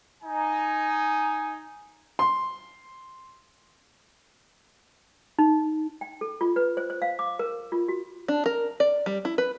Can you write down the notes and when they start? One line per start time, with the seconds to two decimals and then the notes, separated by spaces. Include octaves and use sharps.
0.23 D#4 G#5
2.19 C6
5.39 D#4
6.01 G5
6.21 A4
6.41 F4
6.56 B4
6.77 C5
6.90 C5
7.02 F5
7.19 D6
7.39 A#4
7.72 F4
7.88 F#4
8.28 D4
8.46 A#4
8.80 D5
9.06 G3
9.25 E4
9.38 B4